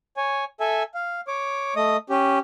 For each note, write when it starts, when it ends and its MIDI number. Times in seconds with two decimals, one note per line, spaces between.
0.17 0.44 73
0.17 0.44 80
0.60 0.83 69
0.60 0.83 76
0.60 0.83 80
0.94 1.21 77
1.28 1.74 73
1.28 1.74 86
1.76 1.97 57
1.76 1.97 75
1.76 1.97 87
2.10 2.39 61
2.10 2.39 67